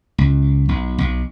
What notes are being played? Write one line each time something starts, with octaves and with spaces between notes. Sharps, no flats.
C#2
B1
B1